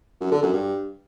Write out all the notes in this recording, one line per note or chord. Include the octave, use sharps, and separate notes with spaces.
F#2
D3
F#2
G2